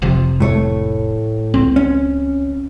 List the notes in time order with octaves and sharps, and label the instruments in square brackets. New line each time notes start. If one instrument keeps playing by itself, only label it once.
[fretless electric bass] F1 C3 F3
[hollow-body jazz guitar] A2 A3 C#5
[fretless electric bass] C#2 C4
[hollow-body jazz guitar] C#4